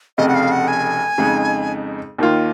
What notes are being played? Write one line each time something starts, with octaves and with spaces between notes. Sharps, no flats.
F1 F2 C#3 D#5
F#5
F5
F#5
G#5
F2 C#3 G#3 D#4
D#2 D#3 A#3 F4